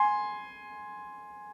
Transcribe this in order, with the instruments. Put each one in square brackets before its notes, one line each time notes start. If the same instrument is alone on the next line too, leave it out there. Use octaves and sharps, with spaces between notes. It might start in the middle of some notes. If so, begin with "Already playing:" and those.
Already playing: [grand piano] G#5 C6